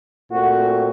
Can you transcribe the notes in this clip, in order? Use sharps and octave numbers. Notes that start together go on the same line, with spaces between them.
A#2 A3 C4 F#4